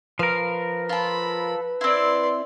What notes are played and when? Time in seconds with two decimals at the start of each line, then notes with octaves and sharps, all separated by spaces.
0.19 F3 A#4 B4 F5
0.89 F4 A4 B5
1.81 C4 E4 D5 C6